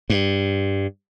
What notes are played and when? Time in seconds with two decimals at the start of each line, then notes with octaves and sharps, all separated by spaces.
0.10 G2